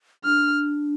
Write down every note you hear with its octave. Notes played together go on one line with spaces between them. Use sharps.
D4 F6